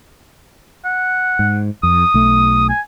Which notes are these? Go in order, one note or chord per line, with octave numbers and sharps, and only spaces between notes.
F#5
G#2
F2 D#6
B1 A3
G#5